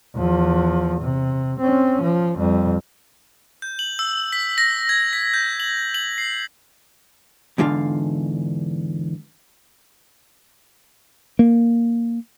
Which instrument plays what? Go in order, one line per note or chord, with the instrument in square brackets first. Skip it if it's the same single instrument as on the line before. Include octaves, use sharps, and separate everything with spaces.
[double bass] E2 F3
C3
C4 C#4
F3
F2 G3
[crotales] G6
F#7
E6
B6
A#6
G#6
B6
G6
F#7
F#7
C7
[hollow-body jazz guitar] E2 G#2 D3 F4 F5
[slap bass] A#3